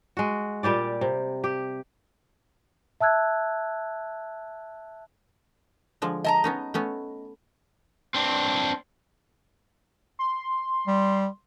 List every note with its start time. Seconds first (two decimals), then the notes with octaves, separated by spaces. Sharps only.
0.17 G#3 F#4
0.63 A#2 G3 G4 D5
1.01 C3
1.44 G4
3.01 E5 A5 E6 F#6 G#6
6.02 D3 F3 G#3
6.24 D#5 A5 A#5
6.44 B3 C#4 D#4
6.74 A3 B3 C#4
8.14 C4 D4
10.19 C6
10.87 G3